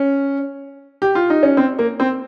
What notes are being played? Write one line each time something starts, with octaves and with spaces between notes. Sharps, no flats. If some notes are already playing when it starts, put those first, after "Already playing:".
Already playing: C#4
G4
F4
D#4
C#4
C4
A#3
C4